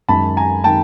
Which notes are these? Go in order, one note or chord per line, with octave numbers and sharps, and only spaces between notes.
F#2 D#3 G#3 A5 B5
G#5 A#5
D#3 G#3 G5 A5